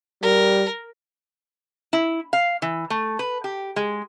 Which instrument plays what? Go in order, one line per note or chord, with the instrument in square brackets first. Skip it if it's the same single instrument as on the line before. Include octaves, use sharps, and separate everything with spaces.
[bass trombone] G3 [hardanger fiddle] A#4
[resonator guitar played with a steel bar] E4
F5
E3
A3
B4
G4
G#3